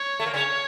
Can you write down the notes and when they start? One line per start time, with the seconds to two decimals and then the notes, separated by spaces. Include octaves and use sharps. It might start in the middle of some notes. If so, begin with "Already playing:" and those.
Already playing: C#5
0.20 A3
0.26 A#3
0.34 C#3 C#4 C#5